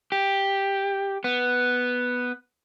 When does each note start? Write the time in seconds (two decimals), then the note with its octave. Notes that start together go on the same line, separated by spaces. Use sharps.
0.12 G4
1.24 B3